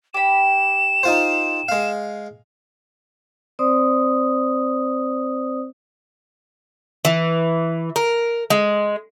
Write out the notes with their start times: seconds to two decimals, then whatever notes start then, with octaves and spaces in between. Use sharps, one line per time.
0.14 G4 B5 E7
1.03 D#4 F4 C5
1.69 G#3 F5
3.59 C4 C5 D5 D#6
7.05 E3
7.96 A#4
8.50 G#3